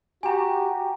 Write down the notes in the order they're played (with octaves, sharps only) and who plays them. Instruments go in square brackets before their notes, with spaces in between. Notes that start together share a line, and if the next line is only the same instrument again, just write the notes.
[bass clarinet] F#4 [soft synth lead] G4 [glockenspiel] G#5 A#5